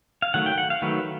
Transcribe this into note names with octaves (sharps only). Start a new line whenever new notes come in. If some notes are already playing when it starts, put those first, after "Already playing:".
F5
D#3 F#3 A3 F#5
G5
F#5
F5
D#3 F#3 A3 B4